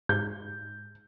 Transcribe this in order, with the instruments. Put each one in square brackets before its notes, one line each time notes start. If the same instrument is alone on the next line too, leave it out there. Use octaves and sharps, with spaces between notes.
[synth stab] G#2 [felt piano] G6